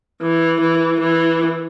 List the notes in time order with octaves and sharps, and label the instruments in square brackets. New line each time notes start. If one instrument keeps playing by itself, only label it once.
[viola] E3
E3
E3